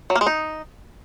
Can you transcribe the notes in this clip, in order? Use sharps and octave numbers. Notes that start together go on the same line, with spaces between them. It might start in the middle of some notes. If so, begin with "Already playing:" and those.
F#3
A#3
G#3
D#4